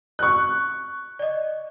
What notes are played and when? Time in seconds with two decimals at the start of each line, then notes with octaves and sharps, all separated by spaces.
0.19 C#6 F#6
1.19 D5 D#5